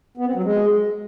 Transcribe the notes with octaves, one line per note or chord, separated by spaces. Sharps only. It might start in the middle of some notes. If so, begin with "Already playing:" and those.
B3
C4
F#3
G#3